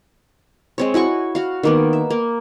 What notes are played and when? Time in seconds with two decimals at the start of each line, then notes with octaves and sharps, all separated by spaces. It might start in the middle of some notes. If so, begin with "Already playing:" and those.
0.78 G#3 C4 C#5
0.94 E4 F#4 G#5 C#6
1.35 F#4 F5
1.63 D#3 A#3 B3
1.93 E5
2.10 A#3